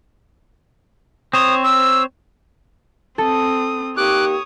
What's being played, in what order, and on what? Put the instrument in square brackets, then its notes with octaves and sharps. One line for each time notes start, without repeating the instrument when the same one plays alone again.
[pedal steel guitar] C4 C5 C#5 [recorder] D#6
[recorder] E6
[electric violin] C4 D#6 [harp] A4
[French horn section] A#3 D#4 G4 [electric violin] C#5 D#6 [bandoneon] D6 F#6